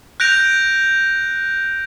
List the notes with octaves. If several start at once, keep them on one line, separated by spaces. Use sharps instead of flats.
F#6 G6 A#6 D7 F7